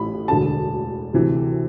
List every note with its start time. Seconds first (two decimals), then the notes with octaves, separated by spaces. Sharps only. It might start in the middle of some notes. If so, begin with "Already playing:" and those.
Already playing: A1 A2 E3 B5
0.28 E1 D2 D3 A5
1.13 D2 C3 E3